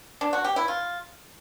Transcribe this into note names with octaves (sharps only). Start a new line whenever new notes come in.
D4
F#4
G4
E4
F4